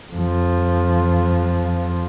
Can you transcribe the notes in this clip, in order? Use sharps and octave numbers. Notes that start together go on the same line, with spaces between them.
F2 F3